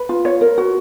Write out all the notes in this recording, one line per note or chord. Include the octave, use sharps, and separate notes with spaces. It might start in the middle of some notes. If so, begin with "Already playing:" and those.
Already playing: B4
F4
C#5
A#4
F#4